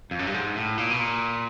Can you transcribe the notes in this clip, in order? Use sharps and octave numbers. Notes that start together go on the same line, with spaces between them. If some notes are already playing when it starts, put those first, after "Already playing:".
F2
F#2
G2
G#2
A2
A#2
B2
A#2